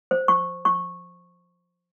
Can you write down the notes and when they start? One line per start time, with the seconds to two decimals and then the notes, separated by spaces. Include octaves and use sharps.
0.11 C5
0.28 C#6
0.65 C#6